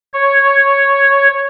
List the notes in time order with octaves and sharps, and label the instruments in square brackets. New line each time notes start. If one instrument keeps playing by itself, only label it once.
[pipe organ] C#5